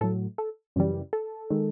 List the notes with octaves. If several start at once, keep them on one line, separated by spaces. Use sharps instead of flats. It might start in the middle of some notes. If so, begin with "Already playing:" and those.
A2 F#3 A4
A4
F#2 C#3 E3 G3
A4
D#3 G#3